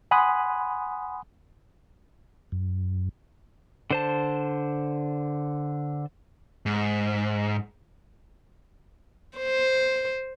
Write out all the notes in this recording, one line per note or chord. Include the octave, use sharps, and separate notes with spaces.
F#5 G#5 B5 C6 D#6 F#6
F#2
D3 C5 A5
G#2
C5